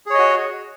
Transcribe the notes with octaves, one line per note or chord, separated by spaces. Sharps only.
F#4 G#4 C#5 D#5